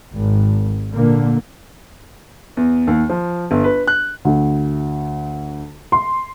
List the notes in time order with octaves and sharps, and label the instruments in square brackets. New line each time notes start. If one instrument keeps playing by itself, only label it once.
[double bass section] G#1
A#2 D3 A#3
[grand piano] E2
D#2
F3
G1
B4
F#6
[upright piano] D2
C6